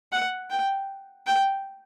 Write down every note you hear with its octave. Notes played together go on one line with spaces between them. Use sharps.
F#5
G5
G5